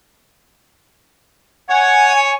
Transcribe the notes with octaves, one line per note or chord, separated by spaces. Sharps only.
C#5 F#5 G#5